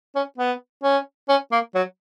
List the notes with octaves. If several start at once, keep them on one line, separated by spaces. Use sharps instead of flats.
C#4
B3
C#4
C#4
A#3
F#3